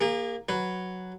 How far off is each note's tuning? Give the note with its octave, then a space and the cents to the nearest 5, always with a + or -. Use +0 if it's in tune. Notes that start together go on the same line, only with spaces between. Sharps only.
A#3 +0 G#4 -40
F#3 +0 B4 +0